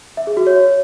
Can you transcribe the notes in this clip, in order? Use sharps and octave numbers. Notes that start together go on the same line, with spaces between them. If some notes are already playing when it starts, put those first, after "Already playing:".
E5
G#4
F#4
C#5